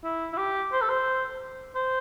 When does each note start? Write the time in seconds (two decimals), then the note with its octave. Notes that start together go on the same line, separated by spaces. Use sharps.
0.04 E4
0.33 E4
0.37 G4
0.72 C5
0.82 A4
0.89 C5
1.76 C5